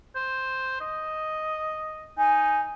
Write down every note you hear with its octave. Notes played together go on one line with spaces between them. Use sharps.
C5
D#5
D#4 G#5